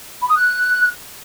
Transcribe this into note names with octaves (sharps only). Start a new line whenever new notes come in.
B5
D#6
F#6